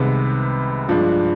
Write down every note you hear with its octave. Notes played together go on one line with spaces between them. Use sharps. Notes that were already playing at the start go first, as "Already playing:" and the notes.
Already playing: C2 C3 D#3 G#3 B3
G2 F3 G#3 D4